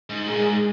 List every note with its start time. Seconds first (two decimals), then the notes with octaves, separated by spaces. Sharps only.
0.10 G#2
0.28 A#2 G#3
0.45 G#2